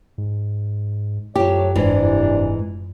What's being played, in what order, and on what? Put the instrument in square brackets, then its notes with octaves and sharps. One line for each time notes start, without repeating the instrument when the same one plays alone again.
[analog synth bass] G#2
[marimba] F#2 F4 [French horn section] F3 A3 C#5 [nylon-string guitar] F#3 G4
[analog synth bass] F1 [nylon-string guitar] G#2 E3 [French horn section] C3 D4